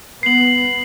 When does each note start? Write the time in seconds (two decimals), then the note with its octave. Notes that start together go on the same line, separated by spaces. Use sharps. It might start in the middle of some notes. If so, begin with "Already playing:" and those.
0.23 B3 C7 F#7